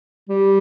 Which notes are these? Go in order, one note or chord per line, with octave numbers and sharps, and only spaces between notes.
G3